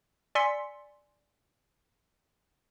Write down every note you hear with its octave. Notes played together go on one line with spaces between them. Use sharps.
D5 G#5 C6 E6 B6 C#7